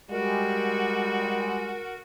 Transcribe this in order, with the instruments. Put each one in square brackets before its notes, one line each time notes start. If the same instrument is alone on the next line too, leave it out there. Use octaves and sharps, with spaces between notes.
[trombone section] G3 G#3 [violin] F#4 [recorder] A#4